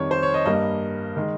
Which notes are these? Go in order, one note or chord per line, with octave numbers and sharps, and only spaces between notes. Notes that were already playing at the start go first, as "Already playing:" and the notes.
Already playing: F2 D#3 G3 C#5
C5
C#5
D#5
G2 G3 A#3 D#5
D#3 G#3